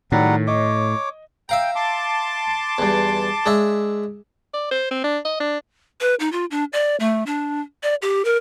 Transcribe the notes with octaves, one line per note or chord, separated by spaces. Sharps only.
A2 D#3 F#3 G3 F#5
C#5 D#5 D6
E5 F5 G5 A#5
A5 C6 D6
E2 G2
G#3 D4 E5
D5
C5
C4
D4
D#5
D4
B4
D#4
F4
D4
D5
A3
D4
D5
G4
A#4